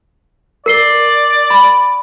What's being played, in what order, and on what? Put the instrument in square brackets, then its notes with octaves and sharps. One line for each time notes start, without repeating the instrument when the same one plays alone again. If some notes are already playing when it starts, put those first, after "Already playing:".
[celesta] A#4 C7 G7 [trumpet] D5
[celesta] B5